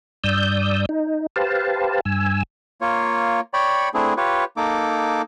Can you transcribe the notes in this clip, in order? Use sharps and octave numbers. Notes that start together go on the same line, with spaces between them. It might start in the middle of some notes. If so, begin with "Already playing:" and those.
G2 D5 D#6 E6 G6
D#4
G4 B4 C5 F5 A5
G2 G#5 E6
A#3 F4 C#5
C#5 D5 G5 B5 C#6
A3 C4 D4 E4 G#4
F4 G4 B4 C#5
A#3 D#4 A4 D6